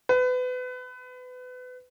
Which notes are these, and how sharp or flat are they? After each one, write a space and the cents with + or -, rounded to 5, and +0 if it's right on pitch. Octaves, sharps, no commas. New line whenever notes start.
B4 +30